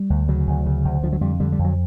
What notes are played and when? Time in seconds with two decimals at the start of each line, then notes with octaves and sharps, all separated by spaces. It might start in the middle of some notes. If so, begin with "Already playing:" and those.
Already playing: G3
0.10 D2
0.28 C#3 F#3
0.47 D2
0.66 C#3
0.85 D2
1.03 D3 F3
1.13 F#3
1.21 F2 G3
1.40 D3 G3
1.52 G3
1.59 F2
1.64 F#3